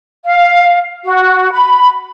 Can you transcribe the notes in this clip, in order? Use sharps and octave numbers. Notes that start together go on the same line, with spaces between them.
F5
F#4
B5